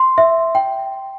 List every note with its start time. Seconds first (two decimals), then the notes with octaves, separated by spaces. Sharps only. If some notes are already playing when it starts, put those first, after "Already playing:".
Already playing: C6
0.18 E5
0.55 G5